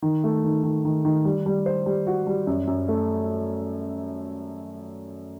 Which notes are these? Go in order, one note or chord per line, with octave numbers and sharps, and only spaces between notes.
D#3
A3
D#3
D#3
D#3
D#3
G3
G3
C5
G3
F#4
G3
F#2
F#2
A3